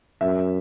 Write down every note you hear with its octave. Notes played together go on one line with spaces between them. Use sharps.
F#2 E5